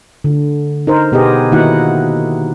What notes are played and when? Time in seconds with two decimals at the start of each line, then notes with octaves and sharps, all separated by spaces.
0.24 D3
0.87 D#4 A#4 C5
1.12 B2 B3 G4 G#4 D#5
1.52 D#3 A#3 D#4 E4 F#4 F#5